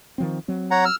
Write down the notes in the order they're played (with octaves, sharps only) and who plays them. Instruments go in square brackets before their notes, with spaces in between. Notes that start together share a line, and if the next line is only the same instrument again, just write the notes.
[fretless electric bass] D#3 F3 C4
F#3 C4
[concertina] C#5 F#5 A#5
E6 F6